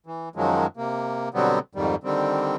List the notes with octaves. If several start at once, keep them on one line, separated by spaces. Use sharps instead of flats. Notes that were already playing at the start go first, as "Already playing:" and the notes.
E3
F#2 D#3 F3 F#3 G#3
C3 A#3
B2 D3 F#3 G3 B3 C4
F2 G#2 D#3 G3
D3 D#3 G3 C4